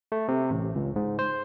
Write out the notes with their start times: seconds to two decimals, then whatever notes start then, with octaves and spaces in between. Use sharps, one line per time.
0.12 A3
0.28 C3
0.50 A1
0.75 C#2
0.96 G#2
1.19 C5